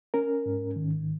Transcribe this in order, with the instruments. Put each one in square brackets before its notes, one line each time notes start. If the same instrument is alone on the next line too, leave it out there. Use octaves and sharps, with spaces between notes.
[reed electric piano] C#4 A#4
G#2
D#3